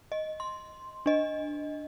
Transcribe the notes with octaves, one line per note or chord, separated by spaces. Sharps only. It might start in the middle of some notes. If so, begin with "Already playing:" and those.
D#5
C6
D4 D#5